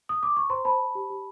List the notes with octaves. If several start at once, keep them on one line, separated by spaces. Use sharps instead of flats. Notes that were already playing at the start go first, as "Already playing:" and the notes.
D#6
D6
C#6
C5 A#5 C6
C5 A5 B5
C5
G4
G4